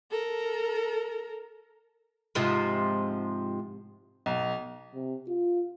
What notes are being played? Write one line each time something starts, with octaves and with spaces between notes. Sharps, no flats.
A4 A#4
G#2 C3 F3
B1
C3
F4